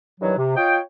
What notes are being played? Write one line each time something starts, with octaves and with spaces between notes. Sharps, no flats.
G2 D#3 E3 F#3
C3
F4 C#5 D#5 G5